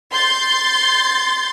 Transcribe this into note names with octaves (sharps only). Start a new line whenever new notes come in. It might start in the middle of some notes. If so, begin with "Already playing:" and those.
C6 G6 A6